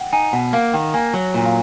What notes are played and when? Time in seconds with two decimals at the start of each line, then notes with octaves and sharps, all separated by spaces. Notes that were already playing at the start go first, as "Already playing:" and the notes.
Already playing: F#5 G5
0.13 D#4 G#5
0.33 B2 F#5
0.53 A#3 F5
0.74 D#3 G5
0.94 A#3 G#5
1.14 F#3
1.34 A#2
1.46 F5